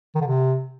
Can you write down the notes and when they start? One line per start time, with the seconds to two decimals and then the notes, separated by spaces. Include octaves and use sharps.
0.15 D#3
0.21 D3
0.27 C3